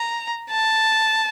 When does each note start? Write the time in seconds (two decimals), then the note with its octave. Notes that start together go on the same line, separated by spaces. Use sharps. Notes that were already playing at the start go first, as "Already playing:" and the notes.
Already playing: A#5
0.50 A5